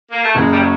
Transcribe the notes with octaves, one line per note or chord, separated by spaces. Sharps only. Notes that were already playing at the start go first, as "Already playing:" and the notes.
A#3
A3
F#1 G#3
G3
F#3